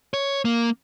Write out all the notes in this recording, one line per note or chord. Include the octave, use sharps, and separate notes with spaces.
C#5
A#3